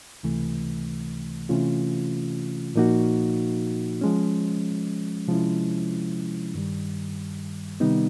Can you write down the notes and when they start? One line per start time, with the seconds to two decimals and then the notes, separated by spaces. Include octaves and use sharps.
0.23 C#2 C3 E3 A3
1.49 C3 E3 A3 C#4 F4
2.75 A#2 F3 A#3 D#4 F#4
4.01 F3 G#3 C#4
5.28 C3 F3 G#3 C#4 E4
6.55 G2 D#3 G3
7.80 C3 D#3 G3 B3 D#4